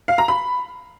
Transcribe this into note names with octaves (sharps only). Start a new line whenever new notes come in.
F5
A#5
B5